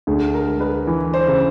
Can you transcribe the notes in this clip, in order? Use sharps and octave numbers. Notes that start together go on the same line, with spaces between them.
D2 G#4
A#4
G#3
B4
E3
C5
C#3